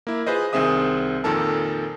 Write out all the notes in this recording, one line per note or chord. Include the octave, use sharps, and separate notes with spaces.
A#3 E4
F4 G#4 B4 C5 D#5
C2 D#3 C4 G#4 E5 D#6
F2 A#2 D#3 A4 A#4 A5